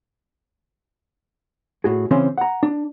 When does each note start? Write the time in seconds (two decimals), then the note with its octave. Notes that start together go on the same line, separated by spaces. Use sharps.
1.84 A2 F#4 G#4
2.11 C#3 E3 C4 C#4 C5
2.38 F#5 A#5
2.63 D4